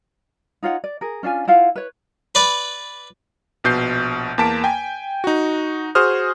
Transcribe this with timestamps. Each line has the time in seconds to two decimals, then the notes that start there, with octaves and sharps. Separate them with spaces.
0.63 D#4 F4 C#5 F#5
0.84 D5
1.01 G#4 A#4
1.23 C#4 D4 F4 G#5
1.47 E4 F4 F5 F#5
1.76 B4 C#5
2.35 B4 D5 B5
3.64 A#1 B2 G6 C7
4.38 E2 A#3 A5 B6 D7
4.64 G5 G#5
5.24 D#4 F#4
5.95 F#4 G#4 C5 D#6 F6